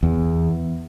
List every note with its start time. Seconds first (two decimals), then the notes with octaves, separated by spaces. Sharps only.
0.03 E2